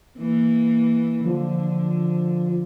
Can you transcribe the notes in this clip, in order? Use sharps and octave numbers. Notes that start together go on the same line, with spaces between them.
E3 A#3
D3 F3